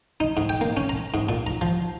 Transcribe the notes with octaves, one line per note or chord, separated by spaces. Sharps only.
D#4
G#2
G5
A#3
C#4
A#5
G#2
A#2
A#5
F3